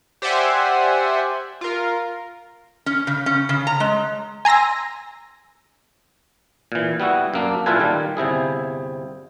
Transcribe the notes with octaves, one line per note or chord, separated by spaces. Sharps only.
G4 C5 D5 E5 F#5 G#5
F4 A#4
C#4
C#3
C#4
C#3
A#5
G#3
G#5 A#5 C6 E6 A#6
A#2 E3
G3 B3 E4 F#4
F#2 A#3 D4
A#2 E4 F4 A4 B4 G#5
D#3 G3
G1 C3 E4 G#4